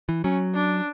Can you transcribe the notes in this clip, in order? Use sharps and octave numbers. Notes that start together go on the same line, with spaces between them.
E3
F#3 C#4
D4